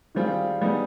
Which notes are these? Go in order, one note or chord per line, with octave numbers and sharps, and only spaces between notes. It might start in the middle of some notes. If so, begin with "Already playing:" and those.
D#3 G3 C4 F4 G#4
G3 B3 D#4 G#4